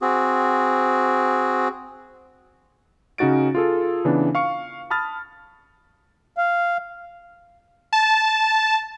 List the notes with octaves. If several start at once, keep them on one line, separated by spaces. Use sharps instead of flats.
C4 F#4 G#4
C#3 C#4 D#4 F#4 A6 D7
F4 G#4 A4
C#3 E3 B3 D4
F5 C#6 C#7
A5 B5 D#6 F6 A6
F5
A5